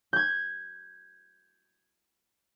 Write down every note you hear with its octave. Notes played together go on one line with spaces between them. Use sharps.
G6 G#6